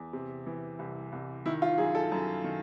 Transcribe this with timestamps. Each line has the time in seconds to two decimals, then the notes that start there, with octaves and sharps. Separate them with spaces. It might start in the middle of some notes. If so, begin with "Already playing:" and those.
Already playing: E2
0.13 C3
0.47 E3
0.79 C2
1.12 C2
1.46 D#3 E4
1.62 F4
1.78 F#2 G#4
1.95 A4
2.12 F#2
2.44 D#3